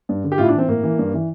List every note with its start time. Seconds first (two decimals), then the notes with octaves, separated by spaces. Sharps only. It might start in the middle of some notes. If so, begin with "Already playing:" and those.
0.09 G2
0.24 D3
0.32 G4
0.38 A2 F4
0.44 E4
0.48 D4
0.54 E3 C4
0.68 A2 A#3
0.83 E3
0.99 G2
1.14 E3